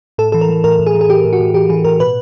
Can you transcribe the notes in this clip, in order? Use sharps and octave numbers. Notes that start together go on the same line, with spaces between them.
A2 A4
E3 A4
A#4
E3
A2 A#4
A2
G#4
E3
G#4
E3 G4
A2
F#4
A2
E3 G4
E3 G#4
A2 A#4
B2 B4